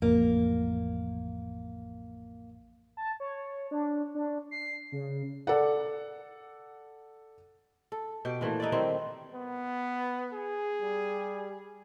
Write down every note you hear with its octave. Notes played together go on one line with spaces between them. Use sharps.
A1 F2 A#3
A5
C#5
D4
D4
C7
C#3
A4 D5 F#5
A4
B2 G4 G5
A#2 E3 F3 A3
D#4 E4 B4 D5
D#3 G3 C4 E4
B3
G#4
G3